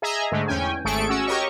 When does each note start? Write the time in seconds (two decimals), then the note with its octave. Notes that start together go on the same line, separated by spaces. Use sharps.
0.02 G#4 D#5 E5 G#5 A#5
0.32 G#2 D3 G#3 A3
0.47 E2 C#4 G5 G#5
0.84 G#1 A3 G#4 A4 C#6 D7
1.09 C#4 F#4 E6
1.27 G4 A#4 C#5 D#5 C#6